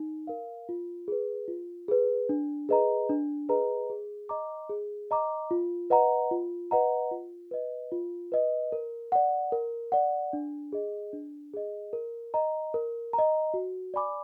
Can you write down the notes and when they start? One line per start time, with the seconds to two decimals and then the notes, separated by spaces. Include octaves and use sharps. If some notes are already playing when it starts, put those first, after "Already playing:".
Already playing: D#4
0.27 A#4 F5
0.69 F4
1.08 G#4 B4
1.48 F4
1.88 G#4 B4
2.29 D4
2.69 G#4 B4 D#5 A#5
3.09 D4
3.49 G#4 B4 D#5 A#5
3.90 G#4
4.29 D#5 A#5 D6
4.69 G#4
5.11 D#5 A#5 D6
5.51 F4
5.90 B4 D#5 F#5 A#5
6.31 F4
6.71 B4 D#5 F#5 A#5
7.11 F4
7.51 B4 D#5
7.92 F4
8.32 B4 D#5
8.72 A#4
9.12 D5 F#5
9.52 A#4
9.92 D5 F#5
10.33 D4
10.72 G#4 D#5
11.13 D4
11.54 G#4 D#5
11.93 A#4
12.34 D#5 A#5
12.74 A#4
13.13 A#5
13.18 D#5
13.54 F#4
13.94 D5 G#5 B5 D6